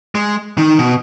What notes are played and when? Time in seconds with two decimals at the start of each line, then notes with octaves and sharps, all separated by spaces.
0.15 G#3
0.58 D#3
0.79 B2